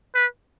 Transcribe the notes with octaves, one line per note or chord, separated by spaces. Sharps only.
B4